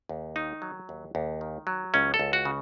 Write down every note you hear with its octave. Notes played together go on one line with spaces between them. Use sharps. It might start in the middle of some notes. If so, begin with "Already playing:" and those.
D#2
D#3 D#4
F#3
D#2
D#2
D#3
F#3
C#2 C#4
A4
C#2
F#4
C#3